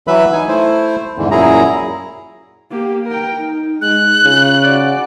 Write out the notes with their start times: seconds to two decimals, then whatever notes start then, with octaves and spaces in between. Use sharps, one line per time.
0.07 E3 F#3 B4 E5 B5
0.33 D#4 G#5
0.48 A3 E4 C5
1.18 E2 G#2 D3 E3
1.31 F#2 A#2 F#3 E4 G#4 A#5
2.70 A#3 G4
3.07 A#4 G5
3.37 D#4
3.81 G#3 F#6
4.24 C#3 F4
4.63 F#4 D5